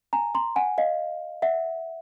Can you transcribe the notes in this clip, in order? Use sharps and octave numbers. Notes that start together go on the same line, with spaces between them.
G#5 A#5
A#5 C6
F#5 G#5
D#5 F5
E5 F#5